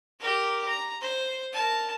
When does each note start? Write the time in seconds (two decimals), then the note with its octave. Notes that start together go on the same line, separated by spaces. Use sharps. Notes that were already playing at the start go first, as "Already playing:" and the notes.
0.20 G4 A#4
0.68 A#5
1.01 C5
1.53 A#4 A5